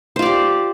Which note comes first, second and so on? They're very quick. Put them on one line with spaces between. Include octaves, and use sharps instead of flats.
C5 F4 D5 G4